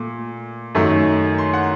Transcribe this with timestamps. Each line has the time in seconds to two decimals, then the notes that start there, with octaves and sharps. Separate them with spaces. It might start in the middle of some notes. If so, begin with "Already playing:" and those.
Already playing: A#2 A3
0.75 F#2 D#3 F#3 A3
1.38 C6
1.54 F#5